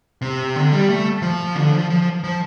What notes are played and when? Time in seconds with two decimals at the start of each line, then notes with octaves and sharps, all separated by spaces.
0.22 C3
0.56 D3
0.72 G3
0.89 A3
1.22 F3
1.55 D3
1.73 F3
1.90 F3
2.24 F3